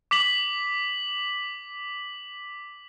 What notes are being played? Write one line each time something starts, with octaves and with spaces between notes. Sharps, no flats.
D6 B6 F#7